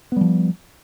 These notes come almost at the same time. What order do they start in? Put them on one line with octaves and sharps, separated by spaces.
B3 G3 F3